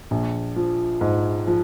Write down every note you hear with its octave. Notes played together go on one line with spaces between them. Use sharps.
A#1
F3
G#2
F3